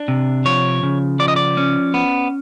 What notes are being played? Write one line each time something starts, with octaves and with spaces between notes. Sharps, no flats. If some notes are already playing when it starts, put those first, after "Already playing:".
Already playing: D4
C3
F3 C#5
C#3
F3 D5
D#5
D5
C#4
B3